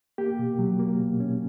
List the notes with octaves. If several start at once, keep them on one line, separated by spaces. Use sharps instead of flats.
A#3 G4
B2
F#3
A#3
B2
C#4